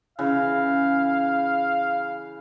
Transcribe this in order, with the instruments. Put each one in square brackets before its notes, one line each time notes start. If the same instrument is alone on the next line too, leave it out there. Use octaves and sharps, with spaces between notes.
[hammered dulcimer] C#3 E3 [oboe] F5